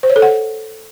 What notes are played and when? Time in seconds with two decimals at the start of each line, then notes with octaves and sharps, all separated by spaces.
0.03 C5
0.10 C#5
0.16 A4
0.22 F#5